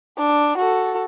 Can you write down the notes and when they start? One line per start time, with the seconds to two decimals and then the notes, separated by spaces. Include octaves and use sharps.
0.18 D4
0.58 F#4 A4